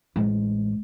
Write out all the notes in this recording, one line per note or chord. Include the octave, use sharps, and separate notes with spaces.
A1 G#3